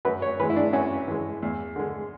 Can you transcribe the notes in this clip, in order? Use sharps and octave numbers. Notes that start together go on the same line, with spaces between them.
F#2 B4
C#5
E3 G#3 B4
E4
D4
F#2 C#4
E3 G#3
E2
D3 G#3